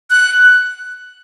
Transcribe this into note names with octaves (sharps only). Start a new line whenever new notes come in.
F#6